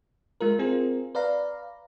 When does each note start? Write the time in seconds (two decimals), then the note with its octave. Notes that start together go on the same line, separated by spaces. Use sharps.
0.41 G#3 F4 A#4
0.59 C4 F4 G#4 A#4
1.15 B4 D5 F5 A#5